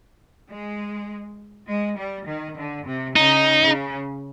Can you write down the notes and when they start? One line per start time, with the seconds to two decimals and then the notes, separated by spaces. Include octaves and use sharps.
0.49 G#3
1.67 G#3
1.97 G3
2.27 D#3
2.57 D3
2.86 C3
3.16 C#3 D#4
3.61 C#3